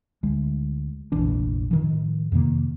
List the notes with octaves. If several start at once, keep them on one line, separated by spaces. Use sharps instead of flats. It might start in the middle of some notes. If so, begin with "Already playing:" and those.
D2 G#3
F1 A#1 E3 D4
A2 D#3 F3
F2 C3 D#3 A#3